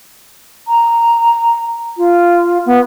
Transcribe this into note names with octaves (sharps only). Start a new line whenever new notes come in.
A#5
F4
B3